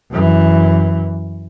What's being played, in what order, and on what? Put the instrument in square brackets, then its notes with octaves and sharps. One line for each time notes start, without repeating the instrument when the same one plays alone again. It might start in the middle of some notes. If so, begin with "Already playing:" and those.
[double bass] F#2 E3